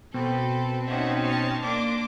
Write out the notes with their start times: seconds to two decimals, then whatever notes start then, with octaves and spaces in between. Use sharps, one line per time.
0.14 B2 C4 A4 B4
0.86 C#4 D#4 E5 F#5 A5
1.22 A5 C#6 F6
1.62 A#3 D4 C6 D6